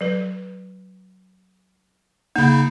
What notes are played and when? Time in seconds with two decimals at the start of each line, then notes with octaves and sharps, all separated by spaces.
0.01 F#3 B4
2.36 C#3 A#3 D#4 B5